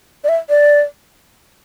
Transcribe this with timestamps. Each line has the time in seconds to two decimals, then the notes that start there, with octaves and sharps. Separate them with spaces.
0.24 D5
0.29 E5
0.49 D5